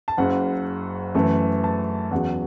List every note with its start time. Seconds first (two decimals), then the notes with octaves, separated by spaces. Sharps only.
0.08 A5
0.17 F#1 F#2 C#3 F#5
1.15 F#2 E3 A3
1.64 A5
2.11 E2 C#3 F#3 F#5